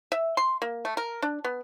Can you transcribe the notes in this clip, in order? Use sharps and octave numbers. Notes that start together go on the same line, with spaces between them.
E5
C6
A#3
A3
A#4
D4
B3